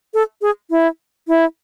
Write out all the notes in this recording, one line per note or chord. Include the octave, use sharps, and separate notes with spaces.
A4
G#4
E4
E4